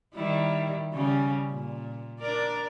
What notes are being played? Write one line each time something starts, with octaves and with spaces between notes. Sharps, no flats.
D#3 G3 E4
C#3 G3 C#4
A#2
D4 A#4 D5